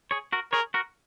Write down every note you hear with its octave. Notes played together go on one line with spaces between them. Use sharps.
G#4 C#5
F#4 A#4
G#4 A#4 C#5
F#4 A#4